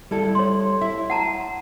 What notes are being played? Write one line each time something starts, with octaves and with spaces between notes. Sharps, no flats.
G3 E4 A4
C#5 C6
E4 E5
F#5 A5 A#5